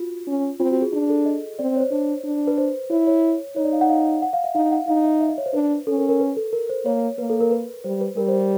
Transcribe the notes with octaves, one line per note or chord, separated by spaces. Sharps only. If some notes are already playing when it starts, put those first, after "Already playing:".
Already playing: F4 F#4
C#4
C4 F4
F#4
G#4
D4 G#4
A4
D#5
C4 D5
C#5
C5
D4 C5
D4
B4
C5
E4 C#5
C#5
D#4 C#5
D5
F5
F#5
F5
F#5
F5
E5
D#4 F5
F#5
D#4 F5
E5
E5
D#5
C#5
C5
D4 B4
C#4 A4
A#4
A#4
B4
A4
A#4
C5
A#3 C#5
A#3 B4
A4
A#4
B4
G3 C5
B4
G3 A#4
C5
G4